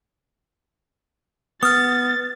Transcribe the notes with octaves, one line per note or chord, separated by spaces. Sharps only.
B3 D#6 F6 A6